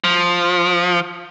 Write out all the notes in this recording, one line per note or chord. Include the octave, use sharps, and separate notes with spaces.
F3